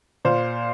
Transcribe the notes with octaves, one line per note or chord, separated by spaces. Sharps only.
A#2 C5 F5